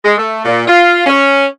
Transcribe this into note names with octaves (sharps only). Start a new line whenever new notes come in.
G#3
A3
A#2
F4
C#4